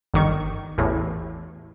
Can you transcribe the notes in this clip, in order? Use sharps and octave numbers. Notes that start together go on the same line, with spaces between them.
G1 D#3 C#6
A1 E2 A2